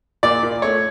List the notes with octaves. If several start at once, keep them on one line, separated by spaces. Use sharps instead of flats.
A#2 D5
A#2
A3 C#5